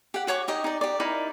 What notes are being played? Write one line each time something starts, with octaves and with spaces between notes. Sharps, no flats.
G4 F#5
F#4 C#5 C#6 D6
D#4 G4 D#5
D#4 D5
G4 D5
D#4 E4 A#4 D5